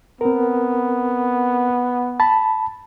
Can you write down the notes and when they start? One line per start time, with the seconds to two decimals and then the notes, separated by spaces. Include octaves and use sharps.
0.21 B3 C4 A#4
2.20 A5 B5